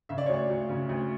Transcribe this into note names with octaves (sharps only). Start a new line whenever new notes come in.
C#3 E5
D5
C#5
D2 D5
D2
C#3
D2